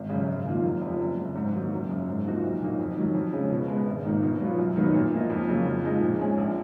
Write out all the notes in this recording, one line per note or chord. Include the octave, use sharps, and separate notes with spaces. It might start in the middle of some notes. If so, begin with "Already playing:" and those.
Already playing: G#1
F#2 C#3
G#1
F#2 D#3 A#3 F4
F1
F2 F3
F#1
F#2 C#3
G#2
D#3 F#3 A#3
F#1
F#2 C#3
G#2
F3 A#3 D#4 F#4
B1
A#2 F#3 A#3 D#4
F2
D#3 F#3
F2
C#3 G#3 C#4
B2
G#3 B3
G#1
G#2 D#3 A#3
B2
F#3 B3 F4
F#2
D#3 F#3 B3 D#4
A#2
F3 A#3 D#4
F2
C#3 F#3 A#3
F2
F3 G#3 D#4
A#2
G#3 C#4 G#4
A#1